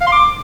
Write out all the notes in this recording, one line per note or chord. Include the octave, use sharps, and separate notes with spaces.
F5
C6
D6